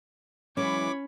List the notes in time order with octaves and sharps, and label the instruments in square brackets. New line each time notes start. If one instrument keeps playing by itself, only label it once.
[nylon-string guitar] E3 F#3 G#3 [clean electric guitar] C#4 [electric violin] C#5 B5 [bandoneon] D6